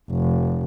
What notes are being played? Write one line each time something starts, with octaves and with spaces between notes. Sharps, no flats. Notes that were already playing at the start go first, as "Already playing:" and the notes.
F1